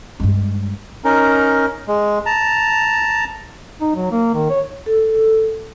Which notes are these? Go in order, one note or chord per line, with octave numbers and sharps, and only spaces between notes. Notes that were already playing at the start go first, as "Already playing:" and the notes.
G2 G#3
C#4 D#4 A#4
G#3
A5 A#5
D#4
F#3
A#3
D#3
C#5
A4